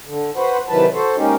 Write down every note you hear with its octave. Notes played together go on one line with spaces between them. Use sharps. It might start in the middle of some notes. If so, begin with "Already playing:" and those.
D3
F#4 B4 C5 F#5
C3 D#3 E3 F#3 B4 A5
F#4 A4 C5
G#3 A#3 C#4 D#4 G4